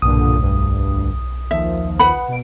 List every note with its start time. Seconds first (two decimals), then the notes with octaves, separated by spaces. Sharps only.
0.02 B1 G2 A#2 D3 D#6
0.39 D2 G2
1.51 D#2 D#3 F3 E5
1.99 B4 F#5 B5
2.28 B2 D7